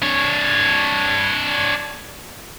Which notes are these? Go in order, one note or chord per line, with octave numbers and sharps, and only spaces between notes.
D4 C#5